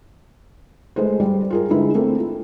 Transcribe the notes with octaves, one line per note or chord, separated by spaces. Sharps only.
G#3 A3 B4 C5
G3
F4 G#4 A#4
D3 G#3 E4 B4
A3 A#3 C4
F4